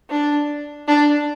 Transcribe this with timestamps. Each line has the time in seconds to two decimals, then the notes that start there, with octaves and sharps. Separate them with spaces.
0.10 D4
0.88 D4